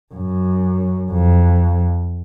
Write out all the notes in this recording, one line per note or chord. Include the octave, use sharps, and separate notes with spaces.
F#2
F2